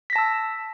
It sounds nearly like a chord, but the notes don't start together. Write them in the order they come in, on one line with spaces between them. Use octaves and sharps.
B6 A#6 A5 E6